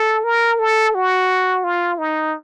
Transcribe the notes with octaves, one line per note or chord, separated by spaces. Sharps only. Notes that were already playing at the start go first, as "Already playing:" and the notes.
Already playing: A4
A#4
A4
F#4
F4
D#4